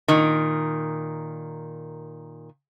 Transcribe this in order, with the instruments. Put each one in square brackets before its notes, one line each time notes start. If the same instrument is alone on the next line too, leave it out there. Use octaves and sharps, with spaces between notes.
[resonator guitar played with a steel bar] A#2 D#3